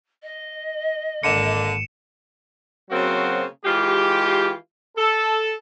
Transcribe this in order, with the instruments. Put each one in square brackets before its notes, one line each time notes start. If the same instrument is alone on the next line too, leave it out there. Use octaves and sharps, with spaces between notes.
[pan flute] D#5
[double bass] G#1 [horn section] D3 A#3 [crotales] C#7 D#7 E7
[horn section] C#3 F#3 A#3 C4 F#4 C5
E3 G#3 F4 G4
A4